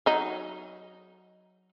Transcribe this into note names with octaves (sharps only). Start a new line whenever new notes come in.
F#3 D#4